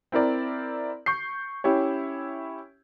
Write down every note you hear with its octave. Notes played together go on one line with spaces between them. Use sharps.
C4 E4 A#4 D5
C#6 G6 C7
C#4 E4 G4 C#5